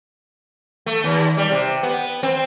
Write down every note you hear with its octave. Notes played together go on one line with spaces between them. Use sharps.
A3
D#2
G3
C3
B3
C4